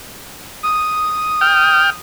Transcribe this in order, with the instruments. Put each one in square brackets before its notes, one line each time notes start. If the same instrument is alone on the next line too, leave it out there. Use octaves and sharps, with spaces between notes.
[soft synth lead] D#6
[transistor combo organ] G5 F6